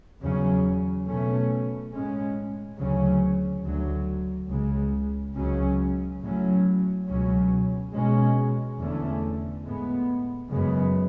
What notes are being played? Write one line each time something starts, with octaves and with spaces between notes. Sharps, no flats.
E2 C#3 F#3 C#4
B2 A3 C#4
A2 G#3 C#4
D2 C#3 F#3 C#4
D2 D3 F#3
C#2 C#3 G#3
C#2 C#3 F#3 C#4
A2 F#3 C#4
C#2 B2 F#3 C#4
B2 G#3 C#4
E2 D3 A3 C#4
A2 G#3 B3
F#2 C#3 G#3 B3